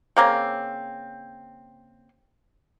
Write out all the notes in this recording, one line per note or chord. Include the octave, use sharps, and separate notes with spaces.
C#3 A#3 C4